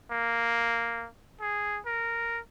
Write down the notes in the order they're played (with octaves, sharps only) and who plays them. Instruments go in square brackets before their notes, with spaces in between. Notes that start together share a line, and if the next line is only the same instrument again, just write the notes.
[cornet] A#3
G#4
A#4